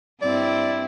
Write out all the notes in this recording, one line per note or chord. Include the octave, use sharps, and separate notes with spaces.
G2 C4 E4 D5